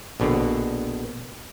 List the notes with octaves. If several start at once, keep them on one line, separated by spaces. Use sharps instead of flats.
A#1 B2 D3